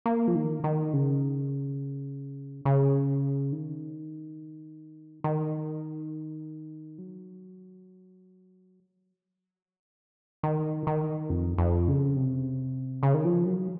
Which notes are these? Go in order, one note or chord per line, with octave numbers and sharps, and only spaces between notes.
A#3
F3
D#3
D#3
C#3
C#3
D#3
D#3
F#3
D#3
D#3
F2
F2
C#3
C3
C#3
D#3
F3
F#3